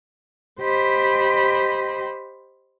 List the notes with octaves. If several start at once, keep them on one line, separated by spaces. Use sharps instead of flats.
G4 C5 D#5 B5